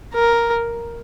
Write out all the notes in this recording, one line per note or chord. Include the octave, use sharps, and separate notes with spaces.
A#4